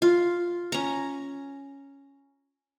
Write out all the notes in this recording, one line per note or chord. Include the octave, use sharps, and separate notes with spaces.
F4
C#4 A#5